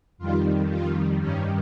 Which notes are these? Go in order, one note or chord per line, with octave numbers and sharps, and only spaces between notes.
F2 D#3 G3 F4
F4
G2 D#3 G3 C#4